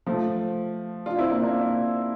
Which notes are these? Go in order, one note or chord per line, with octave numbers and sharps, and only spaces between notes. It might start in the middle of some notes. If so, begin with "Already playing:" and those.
F3 A3
D4 F4
C4 E4
A#3 D4
A#3 D4